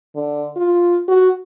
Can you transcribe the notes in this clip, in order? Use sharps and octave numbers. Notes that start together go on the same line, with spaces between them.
D3
F4
F#4